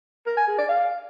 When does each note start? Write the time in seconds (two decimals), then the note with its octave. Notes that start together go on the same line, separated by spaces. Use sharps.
0.26 A#4
0.37 G#5
0.48 G#4
0.58 D5
0.69 F5